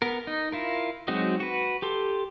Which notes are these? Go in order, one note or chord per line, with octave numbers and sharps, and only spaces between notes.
B3 A#4
D#4
E4 F4 A#4
F#3 G#3 C4 D#4 F#4
F#4 B4
G4 A4 C6